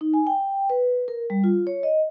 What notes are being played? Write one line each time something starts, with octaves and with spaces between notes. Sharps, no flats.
D#4
G#5
G5
B4
A#4
G3
F4
C#5
D#5